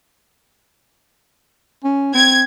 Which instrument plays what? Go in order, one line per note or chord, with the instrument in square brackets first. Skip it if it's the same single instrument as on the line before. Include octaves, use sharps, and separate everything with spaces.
[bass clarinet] C#4
[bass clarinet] C4 [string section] G#6